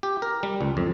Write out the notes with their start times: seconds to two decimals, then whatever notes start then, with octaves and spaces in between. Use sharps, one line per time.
0.03 G4
0.22 A#4
0.43 G3
0.61 C#2
0.77 F2